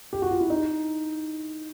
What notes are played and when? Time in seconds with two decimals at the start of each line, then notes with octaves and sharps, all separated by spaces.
0.13 G4
0.22 F#4
0.31 F4
0.41 E4
0.50 D#4